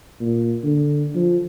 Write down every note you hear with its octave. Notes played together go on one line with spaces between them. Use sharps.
A#2
D3
F3